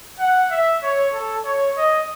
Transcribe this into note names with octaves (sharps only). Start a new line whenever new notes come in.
F#5
E5
C#5
A4
C#5
D#5